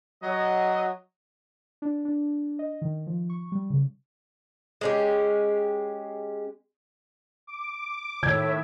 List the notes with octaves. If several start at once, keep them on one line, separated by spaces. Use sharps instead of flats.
F#3 D#5
D4
D4
D#5
D#3
F3
C#6
G3
C#3
G#3 C#4 G4
D6
A2 D#3 C#5 E5 G#6